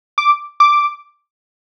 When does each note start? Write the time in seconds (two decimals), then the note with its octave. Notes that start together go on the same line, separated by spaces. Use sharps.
0.18 D6
0.60 D6